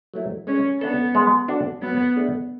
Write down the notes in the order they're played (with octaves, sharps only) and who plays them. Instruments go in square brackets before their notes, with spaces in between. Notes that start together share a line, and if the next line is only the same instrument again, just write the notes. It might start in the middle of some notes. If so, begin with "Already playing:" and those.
[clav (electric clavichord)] F#3 A3 E4
[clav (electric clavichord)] G#3 [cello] C#4
[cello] B3 [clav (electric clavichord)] D4 A4
[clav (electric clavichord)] G#3
D4 F#4 A4
[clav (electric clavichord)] F#3 [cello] B3
[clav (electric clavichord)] A3 D4 G#4